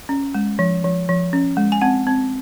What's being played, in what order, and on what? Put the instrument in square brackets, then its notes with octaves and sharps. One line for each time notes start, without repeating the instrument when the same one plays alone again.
[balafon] C#4
G#3
F3
F3
F3
C#4
G#3
G#5
C4 F#5
C4